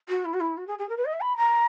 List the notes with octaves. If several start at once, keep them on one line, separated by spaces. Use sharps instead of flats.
F#4
E4
F#4
E4
F#4
G#4
G#4
A#4
B4
D#5
E5
B5
A#5